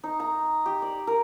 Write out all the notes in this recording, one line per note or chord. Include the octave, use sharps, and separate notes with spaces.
D#4
A#5
G4
D5
A#4